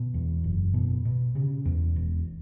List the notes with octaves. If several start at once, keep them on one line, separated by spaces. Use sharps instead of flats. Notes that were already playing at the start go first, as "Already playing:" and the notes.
Already playing: B2
E2
F#1
B2
B2
C#3
E2
E1